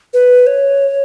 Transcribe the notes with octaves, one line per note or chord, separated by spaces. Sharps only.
B4
C#5